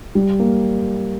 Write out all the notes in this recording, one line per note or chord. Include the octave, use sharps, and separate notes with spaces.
G3
A#3